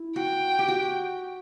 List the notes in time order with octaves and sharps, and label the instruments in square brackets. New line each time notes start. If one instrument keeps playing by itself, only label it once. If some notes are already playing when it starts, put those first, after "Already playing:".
Already playing: [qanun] E4
[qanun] F#4 [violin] G5
[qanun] G4
F#4